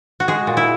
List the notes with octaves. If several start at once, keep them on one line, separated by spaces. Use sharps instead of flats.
F#4
G#3 G#4
A#2
E4